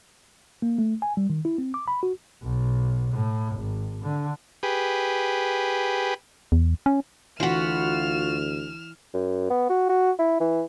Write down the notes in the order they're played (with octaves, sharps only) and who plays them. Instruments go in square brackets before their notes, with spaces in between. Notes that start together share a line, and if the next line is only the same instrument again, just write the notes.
[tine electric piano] A#3
A3
G#5
G3
D#3
E4
C4
D6
B5
F#4
[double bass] B1
A2
G#1
D3
[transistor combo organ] G4 G#4 B4
[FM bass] E2
C#4
[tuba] D2 [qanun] E3 B5 [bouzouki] F4 F#4 [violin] F6 E7
[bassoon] F#2
B3
F#4
F#4
E4
E3